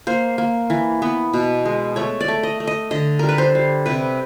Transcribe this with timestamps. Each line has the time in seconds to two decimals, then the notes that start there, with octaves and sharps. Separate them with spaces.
0.07 A#3 C5
0.38 A#3
0.70 E3
1.02 B3
1.33 B2
1.65 G#3
1.96 A3 C#5
2.21 D5
2.28 A3
2.43 D#5
2.60 A3
2.67 D#5
2.91 D3 D#5
3.19 G3 A#4
3.29 B4
3.38 C5
3.55 G3
3.86 C3 B4